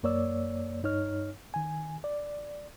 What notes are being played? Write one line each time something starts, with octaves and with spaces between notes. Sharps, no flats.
F#2 A#3 C#5 D5 E6
G2 D#4 C#5 F6
D#3 G#5
D5